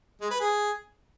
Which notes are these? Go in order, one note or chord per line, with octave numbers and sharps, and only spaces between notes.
G#3
B4
G#4